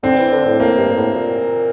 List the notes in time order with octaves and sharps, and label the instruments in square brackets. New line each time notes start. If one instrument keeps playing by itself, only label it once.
[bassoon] D3 [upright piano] C4
[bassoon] E3
D3
A2
[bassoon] A2 [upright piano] A#3
[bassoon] G2
A2
A#2